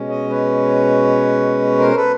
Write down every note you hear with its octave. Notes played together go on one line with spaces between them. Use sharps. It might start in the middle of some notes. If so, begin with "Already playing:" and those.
Already playing: B2 G#3 C#4
C#5 D#5
B4 C#5
A#4 C5
A4 B4